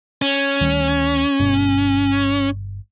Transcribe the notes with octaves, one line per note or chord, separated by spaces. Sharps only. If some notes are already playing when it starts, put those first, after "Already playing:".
C#4
D2 D#3 G3
G1 G2 B2